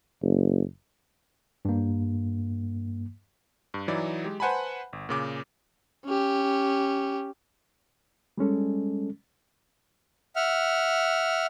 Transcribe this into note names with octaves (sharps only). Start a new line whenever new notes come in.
F#1
G2 A#3
G2
E3 F#3 D#4 E4 D5
G#3 G4
B4 C5 F#5 G#5 A5 B5
G1
A#2 C#3 D6
C#4 G4
G3 G#3 C#4 A4
E5 F#5 F6